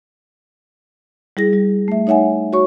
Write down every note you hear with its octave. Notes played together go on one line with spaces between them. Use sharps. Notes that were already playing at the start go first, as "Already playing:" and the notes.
G3 E4 G#4 A#6
G3
A3 E5
D#4 C#5 E5 F#5 G#5
F#4 C#5 C#6